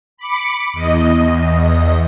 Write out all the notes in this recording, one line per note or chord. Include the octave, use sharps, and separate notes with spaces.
B5 D6 C#7
E2 D#5